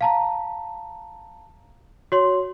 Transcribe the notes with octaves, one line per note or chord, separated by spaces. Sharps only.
F5 A5 A#5
F#4 C#5 C6